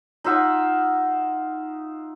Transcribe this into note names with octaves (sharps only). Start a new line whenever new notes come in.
D#4 F4 E5 F#5